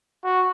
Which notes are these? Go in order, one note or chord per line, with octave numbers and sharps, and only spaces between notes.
F#4